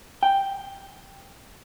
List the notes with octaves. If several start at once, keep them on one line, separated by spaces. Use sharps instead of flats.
G5